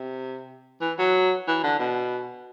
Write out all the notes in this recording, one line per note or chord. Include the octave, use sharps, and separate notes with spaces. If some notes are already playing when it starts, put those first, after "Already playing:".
Already playing: C3
E3
F#3
E3
D3
B2